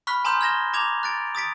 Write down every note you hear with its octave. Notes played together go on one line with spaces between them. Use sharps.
B5 C#6 F6 F#6 B6
G#5 A#5 C6 D#6 F6 G6
F6 G#6 A#6 E7 G7
A#5 D6 G#6 F7
F#6 A6 D7
D#6 A6 B6 D7